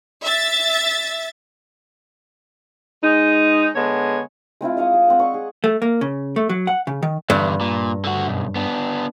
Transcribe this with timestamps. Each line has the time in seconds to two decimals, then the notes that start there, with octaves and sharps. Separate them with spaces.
0.22 E5 A6
3.03 G#3 D#4
3.75 D3 G#3 B3 C#5
4.61 G#3 C4 E4 F4
4.77 D#5 F5 C#6 D#6
4.93 G#4
5.08 C4 F#5
5.19 D5 C#6
5.34 G#4
5.64 A3
5.82 A#3
6.01 C#3
6.36 A3
6.49 F#3
6.67 F#5
6.87 C#3
7.03 D#3
7.30 E2 G2 D3
7.61 A#2
8.05 D3 F#4
8.28 B1 F#2
8.56 B3 D4